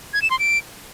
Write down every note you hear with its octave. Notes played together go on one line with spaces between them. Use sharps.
G#6
E7
C6
D7